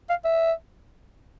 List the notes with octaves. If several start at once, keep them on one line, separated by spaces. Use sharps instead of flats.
F5
E5